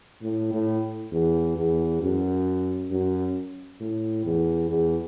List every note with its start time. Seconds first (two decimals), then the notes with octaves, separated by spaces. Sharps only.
0.23 A2
0.53 A2
1.13 E2
1.57 E2
2.02 F#2
2.91 F#2
3.80 A2
4.25 E2
4.69 E2